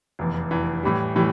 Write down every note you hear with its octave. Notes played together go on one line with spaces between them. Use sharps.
F1 E2 E3
F1 E2 E3
A2 E3 G3
A2 E3 G3